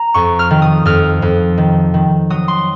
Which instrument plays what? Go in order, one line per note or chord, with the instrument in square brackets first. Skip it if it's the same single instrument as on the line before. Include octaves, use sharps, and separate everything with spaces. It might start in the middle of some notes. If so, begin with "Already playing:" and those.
Already playing: [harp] A#5
F2 C#6
F6
D#3
D#6
F2 F6
F2
D#3
D#3
F#3 D#6
C6